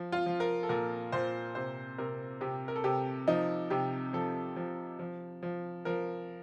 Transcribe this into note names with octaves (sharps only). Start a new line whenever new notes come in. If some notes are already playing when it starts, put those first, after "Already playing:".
Already playing: F3
F4
F3
A#4
A4
A#2 A#4
A#2 C5
C3 C5
C3 A#4
C3 G4
A#4
A4
C3 G4
F3 D#4
C3 G4
F3 A4
F3
F3
F3
F3 A#4